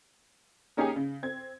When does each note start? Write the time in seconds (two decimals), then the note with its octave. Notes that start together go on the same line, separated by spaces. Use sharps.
0.77 A#3 C#4 D#4 G4 G#4 G#5
0.96 C#3
1.23 C4 G#6